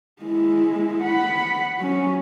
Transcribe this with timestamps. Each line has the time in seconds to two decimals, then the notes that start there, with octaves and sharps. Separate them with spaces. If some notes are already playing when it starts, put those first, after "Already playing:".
0.22 G#3 E4
1.03 F#5 B5
1.79 F#3 C#4